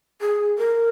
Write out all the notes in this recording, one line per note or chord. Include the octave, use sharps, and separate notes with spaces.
G#4
A#4